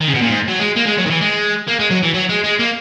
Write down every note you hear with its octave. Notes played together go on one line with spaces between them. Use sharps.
D#3
C#3
B2
A#2
G#2
F#3
G#3
A#3
G#3
F#3
D#3
E3
G#3
A#3
G#3
F#3
E3
F#3
G#3
G#3
A#3